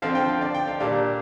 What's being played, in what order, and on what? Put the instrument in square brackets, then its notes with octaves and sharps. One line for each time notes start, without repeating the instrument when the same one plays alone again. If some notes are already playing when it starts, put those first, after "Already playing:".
[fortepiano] D3 F3 C4 F5
G5
F5
D5
G5
F5
A#2 G3 D4 F5